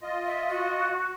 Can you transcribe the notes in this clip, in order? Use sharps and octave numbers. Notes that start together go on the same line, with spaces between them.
F4 D#5
E5
F#4